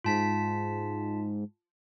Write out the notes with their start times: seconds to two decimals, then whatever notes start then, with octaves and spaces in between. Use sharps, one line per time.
0.04 G#2 F4 A5 B6